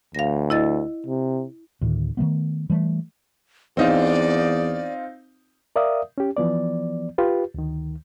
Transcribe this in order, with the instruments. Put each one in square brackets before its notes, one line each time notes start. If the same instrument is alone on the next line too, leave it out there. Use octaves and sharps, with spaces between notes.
[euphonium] D2 [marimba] F5 A#6
[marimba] E4 D#5 A6
[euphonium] C3
[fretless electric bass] D2 A2 D#3
D#3 F3 A3 B3
E3 G3 A3
[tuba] E2 [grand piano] C4 D#4 F4 [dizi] D5
[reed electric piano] A#4 D5 E5 F5 D#6
C#4 G4
E3 F3 B3 D5
F4 G4 B4
D2 D#3